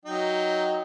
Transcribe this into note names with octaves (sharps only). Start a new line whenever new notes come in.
F#3 D#4 G5